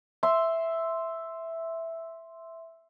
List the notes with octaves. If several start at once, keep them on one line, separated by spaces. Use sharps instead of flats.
E5 C6